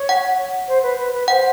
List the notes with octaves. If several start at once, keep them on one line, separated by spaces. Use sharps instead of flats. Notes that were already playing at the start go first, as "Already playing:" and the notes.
Already playing: C#5
F#5
C5
B4
B4
B4
C5 F#5